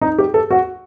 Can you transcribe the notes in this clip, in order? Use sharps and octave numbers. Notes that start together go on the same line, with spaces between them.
D#4
G4
A4
F#4